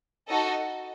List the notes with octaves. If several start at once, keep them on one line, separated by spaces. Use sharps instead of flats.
D#4 F#4 A4 D#5